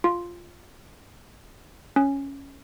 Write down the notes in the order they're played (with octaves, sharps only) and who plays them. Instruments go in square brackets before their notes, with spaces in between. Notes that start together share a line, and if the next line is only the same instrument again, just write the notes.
[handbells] F4
C#4